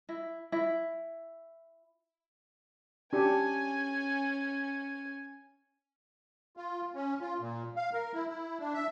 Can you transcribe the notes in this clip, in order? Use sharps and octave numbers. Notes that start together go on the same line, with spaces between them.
E4
E4
C#4 D4 G4 G#5
F4
C#4
F4
A#2
F5
A#4
E4
E4
D4
E5